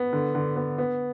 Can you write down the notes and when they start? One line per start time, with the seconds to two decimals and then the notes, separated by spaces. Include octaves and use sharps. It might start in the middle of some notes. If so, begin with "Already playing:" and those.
Already playing: B3
0.13 D3
0.35 D3
0.56 B3
0.78 B3